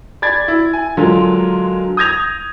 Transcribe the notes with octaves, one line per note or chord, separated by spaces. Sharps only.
D5 B5 G#6 A6
E4
G#5
D3 F#3 G#3 F4 A#4
D#6 G6 G#6 A#6 F7